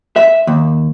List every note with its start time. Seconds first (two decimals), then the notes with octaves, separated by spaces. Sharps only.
0.16 E5
0.47 D#2